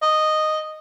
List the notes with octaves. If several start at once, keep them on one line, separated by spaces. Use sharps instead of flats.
D#5